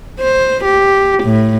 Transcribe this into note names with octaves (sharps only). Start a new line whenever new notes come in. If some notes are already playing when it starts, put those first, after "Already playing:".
C5
G4
A2